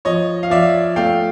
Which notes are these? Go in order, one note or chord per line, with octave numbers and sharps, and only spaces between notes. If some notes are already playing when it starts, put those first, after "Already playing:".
F3 C#5 D#5
F5
F3 D5 E5
A3 F5 G5